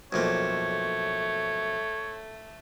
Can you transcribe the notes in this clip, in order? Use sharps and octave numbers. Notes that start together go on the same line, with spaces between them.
B1 F2 A3 A#3 C#5